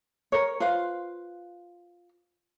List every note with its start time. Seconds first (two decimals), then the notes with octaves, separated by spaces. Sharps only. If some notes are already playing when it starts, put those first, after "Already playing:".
0.32 A#4 C#5
0.60 F4 B4 C5 F5